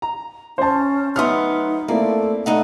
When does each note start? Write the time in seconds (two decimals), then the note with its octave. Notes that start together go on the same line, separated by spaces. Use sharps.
0.02 A#5
0.58 C#4 C5 A5
1.16 F#3 A3 B3 D#4 C6 D#6 F6
1.88 A3 A#3 C4 E4 D5
2.46 G2 A3 D#4 F#5